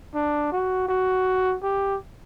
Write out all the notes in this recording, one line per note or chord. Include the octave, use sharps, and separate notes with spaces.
D4
F#4
F#4
G4